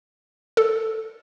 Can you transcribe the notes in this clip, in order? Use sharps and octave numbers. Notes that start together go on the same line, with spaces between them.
A4